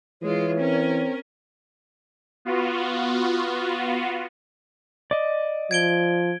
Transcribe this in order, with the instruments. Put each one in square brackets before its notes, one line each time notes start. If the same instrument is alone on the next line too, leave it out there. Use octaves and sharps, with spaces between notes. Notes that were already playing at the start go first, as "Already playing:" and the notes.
[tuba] E3 [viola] G#3 F4 [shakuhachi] C#5
[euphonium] C4 [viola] C#4 A#4
[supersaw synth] B3 F4 F#4
[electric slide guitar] D5 D#5
[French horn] F3 [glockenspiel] G#6 D7 G7